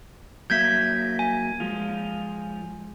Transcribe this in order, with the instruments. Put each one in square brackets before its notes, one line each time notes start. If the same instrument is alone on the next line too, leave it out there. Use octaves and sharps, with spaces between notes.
[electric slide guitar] F#3 A#3 E5 [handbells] G6 G#6 B6
[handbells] G#5
[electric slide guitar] F3 G#3 F4